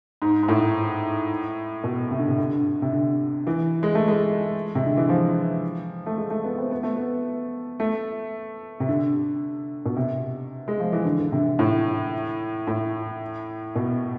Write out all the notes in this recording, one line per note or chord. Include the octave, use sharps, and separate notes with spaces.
G#2
G#2
A2
B2
C3
D3
C3
D3
C3
D3
E3
G#3
A3
G#3
C3
D3
E3
F3
A3
G#3
A3
B3
C4
B3
A3
B3
A3
C3
D3
B2
C3
G#3
F3
E3
D3
D3
C3
A2
A2
B2